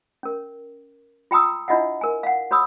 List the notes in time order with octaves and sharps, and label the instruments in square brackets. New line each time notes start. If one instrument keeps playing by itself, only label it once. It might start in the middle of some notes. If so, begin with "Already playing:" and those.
[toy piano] C#4 A#4
F4 G5 A#5 D#6 E6
D4 E4 F4 D#5 E5 F#5
A#4 G#5
F5 F#5
F#4 C#5 B5 D#6 E6